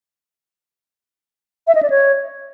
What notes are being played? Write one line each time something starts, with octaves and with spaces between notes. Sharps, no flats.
E5
D#5
D5
C#5